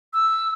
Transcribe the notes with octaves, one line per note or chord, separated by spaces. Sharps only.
E6